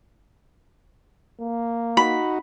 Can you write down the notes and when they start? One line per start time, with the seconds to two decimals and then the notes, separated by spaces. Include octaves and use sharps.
1.41 A#3
1.97 D#4 F#4 B5